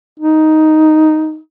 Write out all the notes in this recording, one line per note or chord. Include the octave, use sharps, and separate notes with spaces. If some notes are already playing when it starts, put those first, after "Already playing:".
D#4